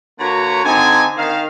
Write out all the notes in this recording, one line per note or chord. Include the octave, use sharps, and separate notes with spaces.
D3 A#3 F#4 B4 C#5 A#5
D3 C4 D#4 G#5
D#3 F5